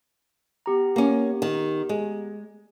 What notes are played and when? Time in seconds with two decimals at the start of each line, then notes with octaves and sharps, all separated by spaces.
0.66 B3 G4 A#5
0.96 A#3 C#4
1.42 D#3
1.89 G#3